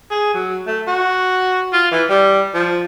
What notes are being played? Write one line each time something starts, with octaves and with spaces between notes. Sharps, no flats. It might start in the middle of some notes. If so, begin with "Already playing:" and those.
G#4
F#3
A3
F#4
F4
E3
G3
F3